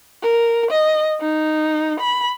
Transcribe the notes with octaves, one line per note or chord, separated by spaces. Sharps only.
A#4
D#5
D#4
B5